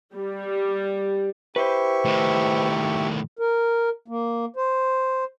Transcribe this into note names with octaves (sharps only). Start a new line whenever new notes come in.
G3
E4 G4 B4 C5 C#6
A2 D#3
A#4
A#3
C5